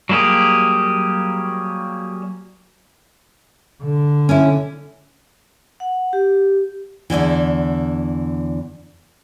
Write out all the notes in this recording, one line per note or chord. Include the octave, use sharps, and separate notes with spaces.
F#3 G3 A#3 G4 G#4
D3
C#4 E4
F#5
G4
E2 G2 D3 E3